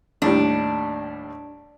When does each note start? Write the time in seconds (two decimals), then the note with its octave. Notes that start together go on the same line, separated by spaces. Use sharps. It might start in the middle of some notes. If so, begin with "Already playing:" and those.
0.22 D#2 A2 G3 D4